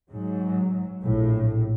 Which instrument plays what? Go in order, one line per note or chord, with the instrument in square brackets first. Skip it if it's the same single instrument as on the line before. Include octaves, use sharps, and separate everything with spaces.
[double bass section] G#2 F#3
A#1 A2